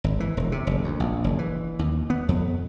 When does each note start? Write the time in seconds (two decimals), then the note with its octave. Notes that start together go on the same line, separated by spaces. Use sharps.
0.04 G#1
0.20 E3
0.37 E1
0.52 C3
0.67 F#1
0.84 D2
1.00 A#1
1.24 F#1
1.39 E3
1.79 D#2
2.10 B3
2.29 F2